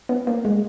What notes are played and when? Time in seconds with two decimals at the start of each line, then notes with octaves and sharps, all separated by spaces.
0.09 B3
0.27 A#3
0.45 G#3